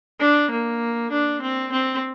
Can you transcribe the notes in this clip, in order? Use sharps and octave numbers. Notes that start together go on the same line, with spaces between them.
D4
A#3
D4
C4
C4